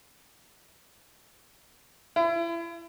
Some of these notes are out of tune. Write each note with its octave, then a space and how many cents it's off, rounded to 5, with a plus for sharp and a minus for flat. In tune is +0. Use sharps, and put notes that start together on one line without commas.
E4 +35